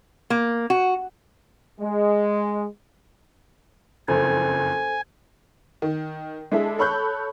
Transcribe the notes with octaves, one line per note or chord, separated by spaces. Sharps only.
A#3
F#4
G#3
F#1 F2 A4 C5 G#5
D#3
G#3 D4 E4 G#4 A4 E5
A4 C#5 B5 C#6 F#6 G6